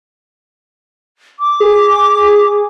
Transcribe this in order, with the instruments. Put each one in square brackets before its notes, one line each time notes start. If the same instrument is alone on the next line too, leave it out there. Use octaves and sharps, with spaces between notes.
[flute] D6
[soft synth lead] G#4